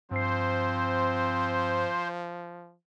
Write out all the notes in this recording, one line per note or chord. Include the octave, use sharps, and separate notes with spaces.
G2 F3 C4 C5 C7